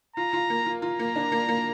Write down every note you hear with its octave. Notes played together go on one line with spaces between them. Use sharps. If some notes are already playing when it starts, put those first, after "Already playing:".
F4 A#5
F4
A#3
F4
F4 A#5
A#3
D4
A#3
A#3